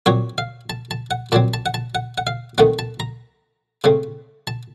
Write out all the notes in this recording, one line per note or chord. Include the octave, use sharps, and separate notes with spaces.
A#2 F#3 C4 C#5
F5
A5
A5
F#5
A#2 F#3 C4 A5
A5
F#5
A5
F#5
F#5
F5
D#3 A3 C4 F#5
A5
A#5
C#3 A3 C4
A5